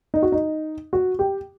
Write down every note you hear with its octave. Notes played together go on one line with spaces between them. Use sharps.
D#4
F#4
D#4
F#4
G4